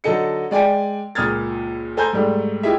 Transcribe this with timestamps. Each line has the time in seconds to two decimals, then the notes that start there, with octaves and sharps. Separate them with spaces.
0.04 D3 F#3 D#4 A4 D#5 C#7
0.51 G#3 D5 G5 G#5 D7
1.15 C#2 A#2 D#6 F6 G#6 A6
1.97 A4 C5 G#5 A#5 G6
2.13 G#2 G3 A3
2.63 E4 F4 G4 G#4 D#5 E5